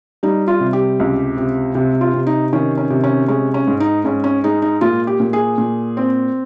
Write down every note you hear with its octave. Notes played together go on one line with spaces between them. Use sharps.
G3 D#4
F4
C3
G4
C#2
C3
C3
F4
C3
D#4
D#3 C#4
C#4
C3
C#4
G#3 C#4
C#4
G#2
D#4
G#2 C#4
C#4
G#3 D#4
D#4
A#2 F4
G4
A#2
G#4
A#2
C4